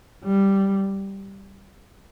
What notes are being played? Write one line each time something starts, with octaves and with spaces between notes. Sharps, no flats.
G3